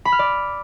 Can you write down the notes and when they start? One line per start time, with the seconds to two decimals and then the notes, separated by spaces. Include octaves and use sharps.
0.05 B5
0.12 F6
0.19 D5